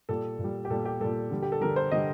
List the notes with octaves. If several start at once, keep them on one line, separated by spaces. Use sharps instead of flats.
A#2 G3 A4
A#2
G3
G4
A#2 G3 A4
G4
A#2 G3 A4
D3 G3
G4
A4
D3 G3 A#4
C5
D3 G3 D#5